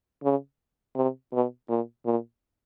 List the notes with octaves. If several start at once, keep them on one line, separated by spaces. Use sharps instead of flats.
C#3
C3
B2
A#2
A#2